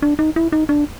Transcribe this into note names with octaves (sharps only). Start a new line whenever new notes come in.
D4
D#4
E4
D#4
D4